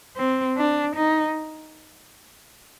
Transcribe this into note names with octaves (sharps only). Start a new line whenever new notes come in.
C4
D4
D#4